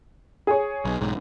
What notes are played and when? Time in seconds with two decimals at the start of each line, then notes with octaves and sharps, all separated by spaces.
0.47 G#4 C#5
0.85 B1
1.01 B1 G#2